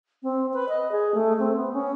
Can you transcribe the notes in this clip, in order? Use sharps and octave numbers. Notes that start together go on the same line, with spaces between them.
C4
B4
D#5
G#4
A3
C4
B3
C#4